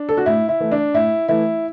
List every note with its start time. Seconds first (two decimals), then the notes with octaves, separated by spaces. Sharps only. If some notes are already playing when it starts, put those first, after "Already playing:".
Already playing: D4
0.09 A4
0.17 F#4
0.26 A2 E4
0.49 E4
0.60 E3 A3
0.72 D4
0.94 A2 E4
1.28 E3 A3 E4